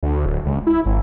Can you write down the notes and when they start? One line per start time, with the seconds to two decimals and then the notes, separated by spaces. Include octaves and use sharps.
0.03 D2
0.26 D1
0.46 C#2
0.67 E4
0.86 G#1